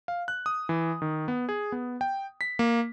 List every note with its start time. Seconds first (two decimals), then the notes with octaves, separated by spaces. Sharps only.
0.08 F5
0.28 F#6
0.46 D#6
0.69 E3
1.02 D#3
1.28 B3
1.49 G#4
1.72 B3
2.01 G5
2.41 B6
2.59 A#3